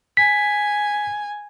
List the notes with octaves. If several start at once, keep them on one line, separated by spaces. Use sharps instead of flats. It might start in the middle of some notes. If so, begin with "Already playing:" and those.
G#5 B6